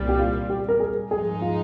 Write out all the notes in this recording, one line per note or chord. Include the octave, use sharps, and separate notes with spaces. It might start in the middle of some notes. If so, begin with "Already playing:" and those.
Already playing: C2 A#2 G3
G4
F4
G4
A#4
G#4
G#2 F3 G#3 D#4 G#4
F4